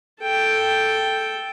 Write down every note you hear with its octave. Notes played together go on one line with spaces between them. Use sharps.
A4 G5